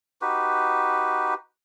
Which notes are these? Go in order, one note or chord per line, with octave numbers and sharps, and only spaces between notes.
D#4 F#4 G4 B4